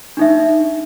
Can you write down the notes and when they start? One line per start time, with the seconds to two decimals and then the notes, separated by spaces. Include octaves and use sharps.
0.17 D4 D#4 E5